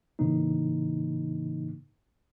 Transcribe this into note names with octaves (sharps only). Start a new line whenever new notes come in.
A2 C#3 E3 A#3 D#4